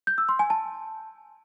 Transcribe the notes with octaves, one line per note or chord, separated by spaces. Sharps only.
G6
E6
C6
G#5
A5